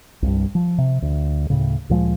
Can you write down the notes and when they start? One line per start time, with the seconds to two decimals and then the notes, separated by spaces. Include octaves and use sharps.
0.22 C2 G2
0.55 F3
0.78 C3
1.02 D2
1.50 D2 A2 C#3
1.89 D2 A#2 F3 G#3